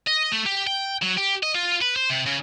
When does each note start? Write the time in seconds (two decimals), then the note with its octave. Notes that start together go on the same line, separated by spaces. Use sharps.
0.08 D#5
0.32 A3
0.46 G4
0.67 G5
1.02 F#3
1.17 G4
1.43 D#5
1.55 F4
1.82 B4
1.96 C5
2.10 C3
2.27 C#3